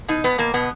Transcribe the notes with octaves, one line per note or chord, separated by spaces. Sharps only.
B2 D#4
B2 B3
B2 A#3
B2 B3